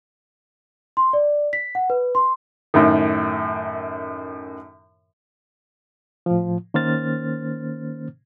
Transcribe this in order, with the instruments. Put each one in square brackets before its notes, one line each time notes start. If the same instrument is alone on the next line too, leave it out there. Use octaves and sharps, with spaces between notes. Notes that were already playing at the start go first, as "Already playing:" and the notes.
[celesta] C6
D5
B6
F#5
B4
C6
[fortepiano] F#2 A2 D#3
[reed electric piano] A2 F3
D#3 A#3 C#4 C5 F6 A6